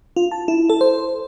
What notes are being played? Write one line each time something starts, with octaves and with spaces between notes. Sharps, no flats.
F4
A5
E4
A4
C5